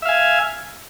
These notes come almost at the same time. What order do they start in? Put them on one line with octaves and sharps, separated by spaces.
E5 F5 G#5